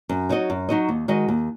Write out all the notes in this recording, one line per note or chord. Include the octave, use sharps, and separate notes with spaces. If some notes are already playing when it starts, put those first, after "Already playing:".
F#2
F#3 D#4 F#4 D#5
F#2
F#3 D#4 F#4 D#5
D#2
D#3 G#3 F#4 D#5
D#2